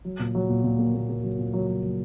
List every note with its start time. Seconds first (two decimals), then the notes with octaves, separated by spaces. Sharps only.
0.05 F#3
0.20 A#2
0.35 F#3
0.49 A#2
0.64 A#2
0.79 A#3
0.94 A#3
1.09 A#3
1.23 F#3
1.39 A#2
1.54 F#3
1.68 F#3
1.83 F#3